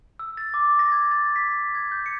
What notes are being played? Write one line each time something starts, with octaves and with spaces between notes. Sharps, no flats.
E6
A6
D6
A#6
G#6
A6
B6
G#6
G6
C#7